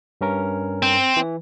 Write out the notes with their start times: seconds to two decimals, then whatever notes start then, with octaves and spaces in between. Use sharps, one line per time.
0.21 G2 C#4 A#4
0.82 C4
1.17 E3